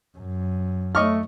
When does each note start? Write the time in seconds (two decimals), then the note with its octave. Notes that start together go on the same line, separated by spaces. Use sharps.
0.18 F#2
0.95 A3 D#5 C#6 F6